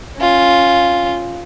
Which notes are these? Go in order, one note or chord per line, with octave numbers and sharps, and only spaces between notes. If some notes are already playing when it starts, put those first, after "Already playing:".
C#4 F4